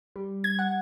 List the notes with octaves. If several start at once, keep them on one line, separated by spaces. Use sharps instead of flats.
G3
G#6
F#5